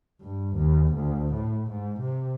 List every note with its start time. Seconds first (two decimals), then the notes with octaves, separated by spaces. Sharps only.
0.21 G2
0.56 D#2
0.95 D2
1.34 A2
1.71 G#2
2.00 C3